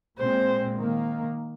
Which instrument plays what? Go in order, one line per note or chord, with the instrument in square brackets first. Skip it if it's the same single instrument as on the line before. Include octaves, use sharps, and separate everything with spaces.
[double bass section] A#2 G#3 C4 [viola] C5
[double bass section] D#3 A#3